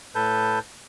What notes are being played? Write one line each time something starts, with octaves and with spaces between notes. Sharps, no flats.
A2 A4 B4 A5 G6